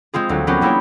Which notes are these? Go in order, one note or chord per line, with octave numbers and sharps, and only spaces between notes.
G#3 C4 F4 G#4
D2 F#3
F#3 A#3 B3 C#4 F4 G4
G3 A#3 E4 G#4 C#5 G5